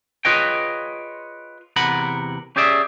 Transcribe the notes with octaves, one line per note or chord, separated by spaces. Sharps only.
F4 G#4 B4 C#5 D#5 G5
E2 C3 A#4 F#5 B5
C#4 G4 G#4 D5 E5